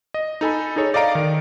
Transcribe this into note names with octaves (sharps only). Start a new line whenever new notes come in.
D#5
D#4 A4 G#5 B5
D#4 G#4 A4 C#5
D5 D#5 F5 A#5 D7
D#3